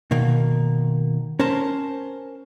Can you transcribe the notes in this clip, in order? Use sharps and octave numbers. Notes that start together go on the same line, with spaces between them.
B2 D#3 A#3
C#4 A#4 C5 A5